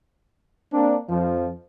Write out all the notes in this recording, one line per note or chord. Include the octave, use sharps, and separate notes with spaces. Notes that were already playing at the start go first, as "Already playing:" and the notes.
A#3 C4 D4
F2 F3